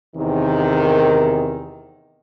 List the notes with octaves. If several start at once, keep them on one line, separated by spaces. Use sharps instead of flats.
E2 C3 D#3